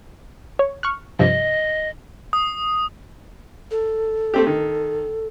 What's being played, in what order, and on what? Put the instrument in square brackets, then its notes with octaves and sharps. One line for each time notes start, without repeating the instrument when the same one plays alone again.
[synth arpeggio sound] C#5
C#6 F6 F#6
[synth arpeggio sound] G2 C3 F3 [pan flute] D#5
[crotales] D#6
[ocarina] A4
[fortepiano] A3 C4 G4
D#3